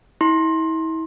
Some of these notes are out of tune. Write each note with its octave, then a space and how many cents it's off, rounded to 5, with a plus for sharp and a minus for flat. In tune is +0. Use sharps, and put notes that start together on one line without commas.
E4 -35 C6 +20